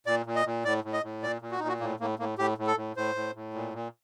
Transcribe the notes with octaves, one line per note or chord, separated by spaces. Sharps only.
A#2 D5
A#2
D#5
A#2
A2 D5
A2
D#5
A2
A#2 D5
A#2
F#4
A#2 D#4
F#4
A2 A#3
A2 A#3
A2 A#3
A2 G4
A2
A4
A2
A2 C5
A2
A2
A#2
A#2